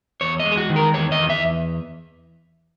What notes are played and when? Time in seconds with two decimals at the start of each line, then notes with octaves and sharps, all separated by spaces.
0.21 E2 C#5
0.40 D#5
0.46 G#3
0.52 G#4
0.57 F#4
0.70 D#3
0.76 A#4
0.94 E2 C#5
1.12 D#5
1.18 E2
1.30 E5